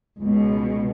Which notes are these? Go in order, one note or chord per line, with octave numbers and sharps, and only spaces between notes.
C#2 B2